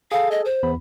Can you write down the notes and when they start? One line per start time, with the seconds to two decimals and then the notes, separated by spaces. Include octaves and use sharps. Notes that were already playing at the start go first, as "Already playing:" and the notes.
0.12 G#4 A4 F5
0.31 D#5
0.45 C5
0.63 E2 B3 B5